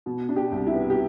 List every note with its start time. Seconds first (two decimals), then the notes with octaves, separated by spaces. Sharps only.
0.06 B2
0.29 D4
0.36 G4
0.52 C2
0.67 E4
0.74 B3
0.90 G4